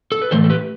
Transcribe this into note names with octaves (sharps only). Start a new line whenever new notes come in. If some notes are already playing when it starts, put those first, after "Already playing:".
A4
B4
A2 E3 A3 A4 C5
A4
G4 B4